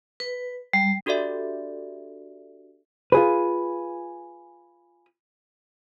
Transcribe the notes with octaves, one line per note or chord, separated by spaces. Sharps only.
B4
G3
D4 F#4 G4 A4 D5 E5
F4 G#4 B4